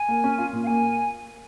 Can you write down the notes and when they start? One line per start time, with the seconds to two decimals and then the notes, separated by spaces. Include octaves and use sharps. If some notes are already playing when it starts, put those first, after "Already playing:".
Already playing: G#5
0.08 A#3
0.24 C#4
0.38 F4
0.53 A#2
0.64 F5
0.67 A#3 G#5